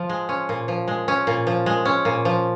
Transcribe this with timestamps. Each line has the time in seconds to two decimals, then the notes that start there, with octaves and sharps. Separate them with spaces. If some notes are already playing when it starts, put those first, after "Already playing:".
Already playing: F3
0.09 G#3
0.29 C#4
0.49 A#2
0.68 F3
0.88 G#3
1.08 C#4
1.27 A#2
1.47 F3
1.66 G#3
1.85 C#4
2.05 A#2
2.25 F3